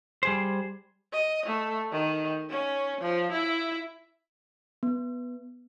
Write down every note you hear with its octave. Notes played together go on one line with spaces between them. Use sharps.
G3 G#4 C5
D#5
A3
D#3
C#4
F3
E4
B3